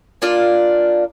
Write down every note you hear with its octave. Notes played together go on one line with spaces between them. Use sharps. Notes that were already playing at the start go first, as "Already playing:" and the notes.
A#3 D4 F4 D5